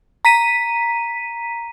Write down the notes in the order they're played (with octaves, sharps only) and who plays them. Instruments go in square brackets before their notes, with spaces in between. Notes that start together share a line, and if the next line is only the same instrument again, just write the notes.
[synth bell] A#5 B6 D#7